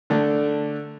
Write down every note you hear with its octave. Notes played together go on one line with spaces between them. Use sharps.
D3 A3 D4